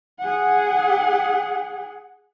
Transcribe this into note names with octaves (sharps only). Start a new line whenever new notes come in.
G#4 F#5